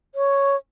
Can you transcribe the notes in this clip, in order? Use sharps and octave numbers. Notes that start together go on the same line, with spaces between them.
C#5